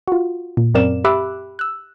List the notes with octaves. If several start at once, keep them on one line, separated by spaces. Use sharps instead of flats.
F4 F#4
A#2
F#2 C4 A#4 D5 F5 E7
G4 E5 B5 D6 E6 F#6
E6 F#6